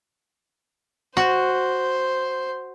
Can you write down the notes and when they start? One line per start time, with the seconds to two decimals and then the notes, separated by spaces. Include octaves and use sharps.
1.17 F#4 C5